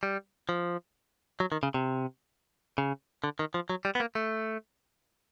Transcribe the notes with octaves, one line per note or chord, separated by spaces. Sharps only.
G3
F3
F#3
D#3
C#3
C3
C#3
D3
D#3
F3
F#3
G3
B3
A#3
A3